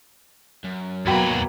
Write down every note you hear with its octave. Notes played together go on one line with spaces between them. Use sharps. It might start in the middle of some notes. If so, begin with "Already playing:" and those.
F#2
D#2 B2 F#3 A#3 F#4 G5 B5